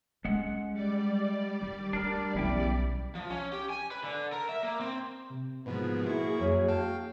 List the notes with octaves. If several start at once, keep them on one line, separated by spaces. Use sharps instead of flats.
G#3 C#4 F#5
G3 D5
D#3
A3 D4 A#4
B1 E2 C#4 E4 G5
F3
C#4
G4
G#5
B4
D3
A#4
E5
A#3
C4
C3
G#2 B2 F3 A#3 G#4 B4
E4 F#4 C#6
F#2
F5 G5 A5